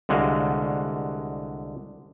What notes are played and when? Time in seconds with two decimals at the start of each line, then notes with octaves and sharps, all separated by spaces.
0.09 C2 D3 G#3 F#4 F5